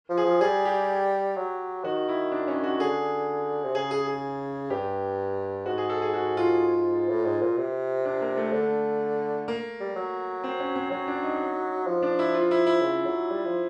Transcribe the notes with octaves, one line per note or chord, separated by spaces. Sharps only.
F3
G#4
F3
G3 G#4
G4
F#3
D#3 F#4
E4
D4
C#4
F#4
D3 G#4
C3
C#3 G#4
G#4
G#4
G2 G4
G#2 F#4
G#4
A4
G#4
F#4
F4
A2
G#2
A#2
C3
D4
A#3
A3
D3
A#3
G3
F#3
C4
C#4
C4
F#3 C#4
D4
D#4
F3
D4
E4
F4
E4
E4
C#3
F#3
G3
F3